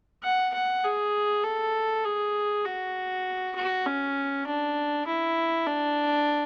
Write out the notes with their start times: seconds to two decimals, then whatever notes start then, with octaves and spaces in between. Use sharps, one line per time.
0.23 F#5
0.54 F#5
0.84 G#4
1.44 A4
2.04 G#4
2.65 F#4
3.55 F#4
3.86 C#4
4.47 D4
5.07 E4
5.67 D4